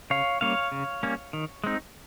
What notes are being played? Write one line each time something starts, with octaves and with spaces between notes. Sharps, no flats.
C#3 C#5 F5
G3 A#3 C#4 C#5 F5
C#3
G3 A#3 C#4
D#3
G#3 C4 D#4